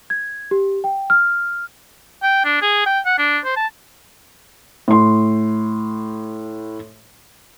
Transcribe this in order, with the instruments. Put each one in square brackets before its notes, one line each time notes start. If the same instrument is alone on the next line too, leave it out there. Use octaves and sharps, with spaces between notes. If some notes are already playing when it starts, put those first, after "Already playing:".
[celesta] G#6
G4
G5
F6
[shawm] G5
D4
G#4
G5
F#5
D4
C5
A5
[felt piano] A2 C6